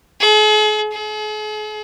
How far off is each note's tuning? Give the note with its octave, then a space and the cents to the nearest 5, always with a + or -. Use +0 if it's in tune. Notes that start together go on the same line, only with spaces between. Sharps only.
G#4 +45
G#4 +45